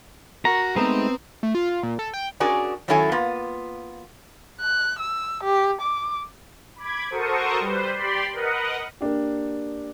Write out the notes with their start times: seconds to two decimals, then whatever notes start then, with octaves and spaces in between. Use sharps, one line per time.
0.45 F#4 A#4 A#5
0.76 G#3 A3 B3 C4 D#4 A#5
1.43 A3
1.55 F4
1.69 F4
1.83 A#2
1.99 A4
2.14 G5
2.40 C#4 D4 F#4 G#4 A#4 D5
2.88 D#3 F#3 C#4 E4 A4 G#5
3.12 A#3 B3 F4
4.61 F#6
4.99 E6
5.44 G4
5.81 D6
6.76 B5 D6 G#6
7.10 F#4 A4 A#4 C5 C#6 D#6
7.60 G3 B4 C5
7.94 G4 D5 B5 C6
8.33 A#4 B4 D#5 F#5
9.01 A#3 D4 G4